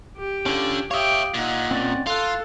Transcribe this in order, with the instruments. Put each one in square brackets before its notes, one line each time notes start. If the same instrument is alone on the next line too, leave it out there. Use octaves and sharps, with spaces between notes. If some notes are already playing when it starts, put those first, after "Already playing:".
[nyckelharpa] G4
[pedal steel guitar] C#4 F4 G6 [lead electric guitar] D4 A4
[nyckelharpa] G4 G5 [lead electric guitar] C#5 E5 [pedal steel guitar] F5 D6 D#6
[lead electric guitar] A#2 [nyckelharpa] D#4 F#5
[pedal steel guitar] C4 C#4 D5
[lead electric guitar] F4 [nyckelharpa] A4 [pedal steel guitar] F5 F#6